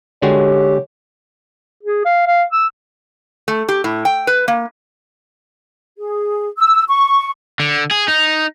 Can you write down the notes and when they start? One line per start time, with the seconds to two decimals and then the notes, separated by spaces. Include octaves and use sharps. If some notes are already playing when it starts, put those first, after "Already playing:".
0.22 D3 G#3 F#4 G4 C#5
1.83 G#4
2.05 F5
2.26 F5
2.52 E6
3.48 A3
3.69 G4
3.84 A2
4.05 G5
4.27 B4
4.48 A#3
5.98 G#4
6.58 E6
6.88 C#6
7.60 D3
7.91 G#4
8.08 D#4